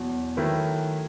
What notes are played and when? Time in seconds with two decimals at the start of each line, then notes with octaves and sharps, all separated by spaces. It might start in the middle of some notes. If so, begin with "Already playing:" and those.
Already playing: E2 B2 F#3
0.37 D#3 F#3 A3 E4 B4